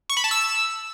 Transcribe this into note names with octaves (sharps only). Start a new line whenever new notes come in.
C#6
B5
A5
E6